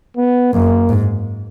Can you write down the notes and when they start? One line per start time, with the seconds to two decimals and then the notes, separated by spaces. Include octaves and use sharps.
0.17 B3
0.53 F#2 A#3
0.89 G#2